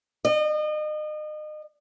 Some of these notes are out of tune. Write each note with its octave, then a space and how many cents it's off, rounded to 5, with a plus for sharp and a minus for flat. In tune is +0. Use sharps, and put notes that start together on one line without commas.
D#5 -35